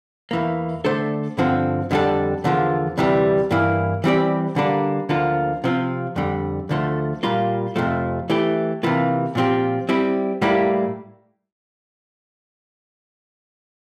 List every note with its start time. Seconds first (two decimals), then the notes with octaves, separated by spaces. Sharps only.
0.31 E2 E3 A#3
0.85 D3 A3 D4 A4 C5
1.38 G2 D3 F3 C4
1.91 F2 D3 G3 D4 A4
2.44 E2 D3 F3 A#3
2.98 D2 C3 E3 G3
3.51 G2 E3 A#3 E4
4.04 E3 G3 C4 G4 D5
4.56 D3 G3 A#3 D4
5.09 D2 D3 F3 A#3 F4
5.64 C3 F3 C4 F4
6.16 F2 D3 G3
6.69 D2 D3 F3 A3
7.23 A#2 G3 A#3 F4
7.76 F2 C3 F3 A3
8.30 E3 A3 E4 G4
8.83 C3 E3 A#3 F4
9.35 A#2 F3 C4 G4
9.89 G3 C4 E4 G4
10.42 A2 G3 A#3 E4 G4